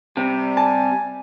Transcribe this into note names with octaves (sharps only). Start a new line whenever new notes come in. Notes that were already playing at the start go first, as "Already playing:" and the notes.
C3 G3
G#5 A5